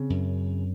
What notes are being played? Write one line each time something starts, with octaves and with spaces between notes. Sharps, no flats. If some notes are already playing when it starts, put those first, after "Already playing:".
Already playing: C#3 C4
F#2